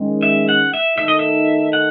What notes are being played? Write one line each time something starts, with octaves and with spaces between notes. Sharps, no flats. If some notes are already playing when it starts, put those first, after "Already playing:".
Already playing: D#3 G#3 C#4
E5
F#5
E5
D#3 A3 D#4 A4 E5
D#5
E5
F#5